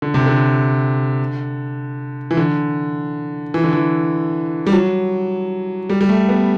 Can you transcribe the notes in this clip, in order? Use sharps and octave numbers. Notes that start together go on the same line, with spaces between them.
D3
C3
D3
E3
D3
E3
D3
E3
G3
F#3
G3
G3
A3
B3